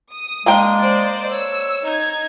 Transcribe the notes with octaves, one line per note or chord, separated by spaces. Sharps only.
D#6
G#3 A#3 D4 G5
C5 D5 D#5
C#5 E6
D#4 G#6